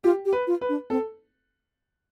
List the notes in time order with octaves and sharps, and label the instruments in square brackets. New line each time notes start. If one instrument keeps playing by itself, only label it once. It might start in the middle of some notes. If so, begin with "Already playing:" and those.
[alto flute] F4 [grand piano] G4
[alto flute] G4
[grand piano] B4
[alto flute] F4
[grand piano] B4
[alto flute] D4
[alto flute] C4 [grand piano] A4